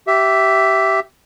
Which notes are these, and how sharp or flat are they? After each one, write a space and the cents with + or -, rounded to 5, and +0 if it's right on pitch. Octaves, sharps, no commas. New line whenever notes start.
G4 -20 E5 +5